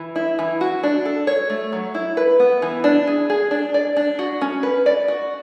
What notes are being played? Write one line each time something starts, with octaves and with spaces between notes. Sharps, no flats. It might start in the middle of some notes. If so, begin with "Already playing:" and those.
Already playing: E3
E4
E3
F#4
D4
A4
C#5
A3
F#3
E4
B4
B3
E3
D4
G#4
G#4
D4
D5
D4
F#4
C#4
B4
D5
F#4